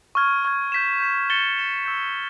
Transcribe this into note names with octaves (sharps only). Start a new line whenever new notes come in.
C#6 F6 G#6
C#6 F6 G#6
G6 B6 E7
G6 B6 E7
A6 C#7 E7 G7
A6 C#7 E7 G7
C#6 E6 G6